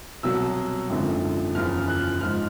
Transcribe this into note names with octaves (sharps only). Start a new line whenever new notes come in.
C2 B2 F#3 E6
G#1 F#2 D3 F3
F#1 E2 C#3 F3 F6
F#6
G#2 F3 F6